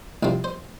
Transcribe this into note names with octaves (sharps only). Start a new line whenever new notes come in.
C2 C3 F3 C4
C5